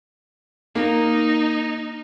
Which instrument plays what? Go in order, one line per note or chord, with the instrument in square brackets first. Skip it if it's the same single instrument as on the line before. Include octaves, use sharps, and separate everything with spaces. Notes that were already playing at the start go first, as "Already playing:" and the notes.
[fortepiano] A#3 [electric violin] D#4